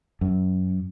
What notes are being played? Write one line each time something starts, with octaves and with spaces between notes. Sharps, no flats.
F#2